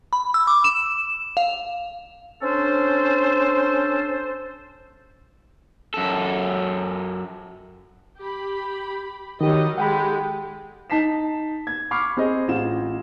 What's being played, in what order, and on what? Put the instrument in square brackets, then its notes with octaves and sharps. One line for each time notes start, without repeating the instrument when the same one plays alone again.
[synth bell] B5
E6
D6
E7
F5
[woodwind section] C#4 D4 A4 C5
[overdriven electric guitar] F#2 A4
[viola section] G4 B5
[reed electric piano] D#3 G4 [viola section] F#3 G3 D#5
[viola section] G#3 G4 A4 [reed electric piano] F#5 G5 B5
[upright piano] D#4 A5 B6 C7 E7
G#6
B5 C#6 D6 F6 C7
C4 G#4 C5 D#5
A1 F4 E7